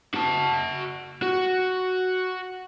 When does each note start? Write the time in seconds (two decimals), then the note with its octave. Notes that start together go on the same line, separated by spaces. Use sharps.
0.15 F#4 A5
1.22 F#4